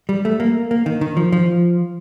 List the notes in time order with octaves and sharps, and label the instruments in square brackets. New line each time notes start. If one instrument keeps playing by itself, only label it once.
[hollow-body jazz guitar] G3
A3
A#3
A#3
D#3
D#3
F3
F3